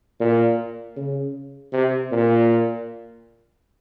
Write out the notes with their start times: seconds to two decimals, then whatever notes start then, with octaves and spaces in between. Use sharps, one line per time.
0.20 A#2
0.96 C#3
1.73 C3
2.12 A#2